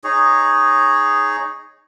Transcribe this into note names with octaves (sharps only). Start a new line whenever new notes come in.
D#4 G#4 C#5